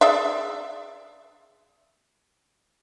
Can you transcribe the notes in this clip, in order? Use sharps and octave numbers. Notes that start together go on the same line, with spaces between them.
G#4 D5 E5